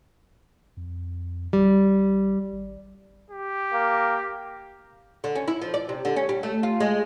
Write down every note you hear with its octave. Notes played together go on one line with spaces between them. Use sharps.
F2
G#1 G3
G#1
G4
A#3
D3
C#4
E4
F3
D5
C3
D3
C#4
G3
A3
F4
G#3